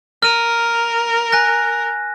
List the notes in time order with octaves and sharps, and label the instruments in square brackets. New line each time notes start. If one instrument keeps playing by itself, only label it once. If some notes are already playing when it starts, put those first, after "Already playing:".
[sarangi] A#4 [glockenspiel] F6 D#7
[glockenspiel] G#5 F#6 A#6